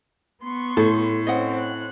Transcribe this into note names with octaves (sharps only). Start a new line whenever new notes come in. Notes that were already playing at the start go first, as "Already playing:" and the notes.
B3 C6 C#6
A2 A4
C4 C#4 D#5 F#5
F#6